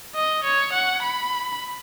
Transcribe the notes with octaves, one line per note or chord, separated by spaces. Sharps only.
D#5
C#5
F#5
B5